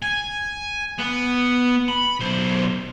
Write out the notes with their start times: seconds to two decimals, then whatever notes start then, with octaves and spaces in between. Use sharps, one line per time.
0.02 G#5
0.98 B3
1.88 B5
2.20 B1 C5